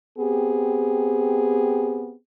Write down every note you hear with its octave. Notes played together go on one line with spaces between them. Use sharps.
B3 C4 G4 G#4